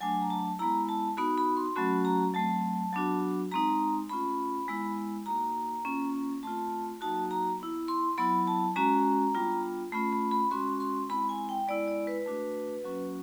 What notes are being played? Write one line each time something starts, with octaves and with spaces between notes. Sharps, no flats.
F#3 A3 D4 G#5
A#5
A5
G#3 B3 E4 A#5
A5
B3 D#4 F#4 B5
B5
C6
F#3 A3 C#4 F#4 B5
A#5
F#3 A3 C4 A5
F#3 B3 D4 F#4
G#3 C4 D#4 A#5
A3 C#4 F4 B5
G#3 B3 E4
A#3 D#4 F#4 A#5
A#3 C#4 F4
A3 C4 F4 A5
F#3 A#3 D#4 F#4 A5
A#5
B3 E4
C6
F#3 B3 E4 B5
A5
G#3 C#4 F#4 A#5
G3 B3 D4 F4
A3 C#4 F4 B5
B5
B5
G#3 C#4 F#4 C6
C6
G#3 C4 E4 B5
G#5
G5
G#3 B3 E4 D5
D5
B4
A3 D4 F#4
F#3 A#3 C#4 F#4